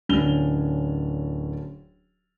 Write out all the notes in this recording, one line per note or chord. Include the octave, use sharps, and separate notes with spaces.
D1 C#4 D4 F7 G7